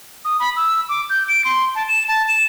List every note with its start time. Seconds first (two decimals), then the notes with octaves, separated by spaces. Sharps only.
0.25 D#6
0.40 B5
0.56 E6
0.89 D6
1.10 G6
1.28 D7
1.45 C6
1.75 A5
1.88 E7
2.08 A5
2.28 E7